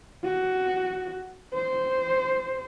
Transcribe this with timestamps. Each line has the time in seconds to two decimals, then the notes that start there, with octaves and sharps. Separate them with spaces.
0.24 F#4
1.54 C5